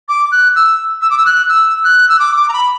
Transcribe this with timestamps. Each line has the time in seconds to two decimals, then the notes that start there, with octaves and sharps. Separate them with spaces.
0.09 D6
0.32 F#6
0.56 E6
1.02 E6
1.10 D6
1.18 E6
1.26 F#6
1.49 E6
1.84 F#6
2.09 E6
2.19 D6
2.37 D6
2.48 A#5
2.53 B5